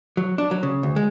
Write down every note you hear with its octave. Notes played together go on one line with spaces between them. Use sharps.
F#3
D4
F#3
C#3
D2
G#3